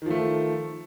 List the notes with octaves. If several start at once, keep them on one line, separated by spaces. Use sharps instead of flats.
D#3 F3 A3